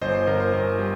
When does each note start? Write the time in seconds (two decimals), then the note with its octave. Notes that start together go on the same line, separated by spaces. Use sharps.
0.02 G1 C5 D#5
0.15 C5
0.27 G1 A#4
0.40 C5
0.53 G1 A#4
0.79 G3